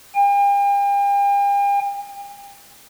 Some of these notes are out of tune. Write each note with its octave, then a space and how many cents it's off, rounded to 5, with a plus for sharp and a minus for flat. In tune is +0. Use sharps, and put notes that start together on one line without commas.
G5 +45